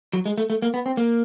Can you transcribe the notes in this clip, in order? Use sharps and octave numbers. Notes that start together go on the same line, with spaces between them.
F#3
G#3
A3
A3
A#3
B3
C4
A#3